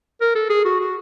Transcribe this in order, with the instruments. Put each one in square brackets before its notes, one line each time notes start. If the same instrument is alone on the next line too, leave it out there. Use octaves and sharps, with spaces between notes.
[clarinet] A#4
A4
G#4
F#4
F#4